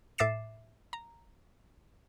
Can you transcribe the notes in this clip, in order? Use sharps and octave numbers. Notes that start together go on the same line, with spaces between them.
A2 E5 D6 A6 C7 E7
A#5